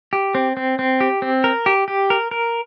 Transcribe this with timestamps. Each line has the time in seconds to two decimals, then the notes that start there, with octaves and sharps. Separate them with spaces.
0.13 G4
0.35 C4
0.57 C4
0.79 C4
1.01 G4
1.22 C4
1.44 A#4
1.66 G4
1.88 G4
2.10 A#4
2.31 A#4